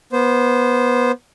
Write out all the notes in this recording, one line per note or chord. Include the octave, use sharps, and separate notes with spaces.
B3 C5